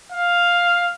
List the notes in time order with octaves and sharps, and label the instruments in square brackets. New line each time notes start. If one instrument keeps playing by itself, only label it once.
[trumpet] F5